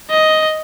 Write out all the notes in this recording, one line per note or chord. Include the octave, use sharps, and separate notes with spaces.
D#5